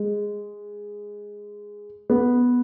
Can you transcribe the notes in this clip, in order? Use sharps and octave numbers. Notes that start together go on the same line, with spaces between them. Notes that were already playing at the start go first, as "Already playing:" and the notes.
Already playing: G#3
B3